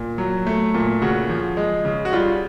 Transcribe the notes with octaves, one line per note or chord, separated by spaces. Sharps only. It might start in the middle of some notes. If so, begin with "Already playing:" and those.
Already playing: A#2
F#3
A3
A#2
C#3 F#4
F3
G#3
C#3
F#4
G3 F4